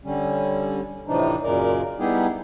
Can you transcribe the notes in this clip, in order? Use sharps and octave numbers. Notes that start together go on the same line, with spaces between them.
D3 G3 C#4
A2 C3 E3 F3 D4 D#4
F#2 A#2 C#3 G#3 A#4 D5
G3 B3 D#4 E4 G4 G#4